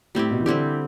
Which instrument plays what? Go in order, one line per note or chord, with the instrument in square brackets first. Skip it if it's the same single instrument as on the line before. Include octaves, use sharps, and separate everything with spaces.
[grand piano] A2 [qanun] G3 C4 E4 G4
[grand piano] B2
E3
[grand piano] D3 [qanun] G3 C4 E4 G4